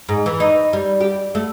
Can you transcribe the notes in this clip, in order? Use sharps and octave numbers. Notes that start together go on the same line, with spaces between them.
G#2
E3
D#4
G3
G4
A3